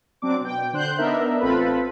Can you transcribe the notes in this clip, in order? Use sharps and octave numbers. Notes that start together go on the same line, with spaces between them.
F#3 C4 D4 D6
B2 G5
D3 C5 F#6 G6
B3 D4 D#4 A#4 E5
A1 C4 F4 A4 B4 B5